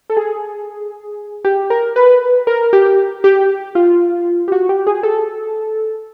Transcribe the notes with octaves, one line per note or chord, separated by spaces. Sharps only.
A4
G#4
G4
A#4
B4
A#4
G4
G4
F4
G4
F#4
G4
G#4
A4